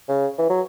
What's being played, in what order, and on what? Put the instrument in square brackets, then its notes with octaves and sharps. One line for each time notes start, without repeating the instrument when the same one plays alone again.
[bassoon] C#3
E3
F#3